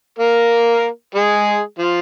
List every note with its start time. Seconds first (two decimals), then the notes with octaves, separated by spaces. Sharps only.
0.19 A#3 A#4
1.15 G#3 G#4
1.79 F3 F4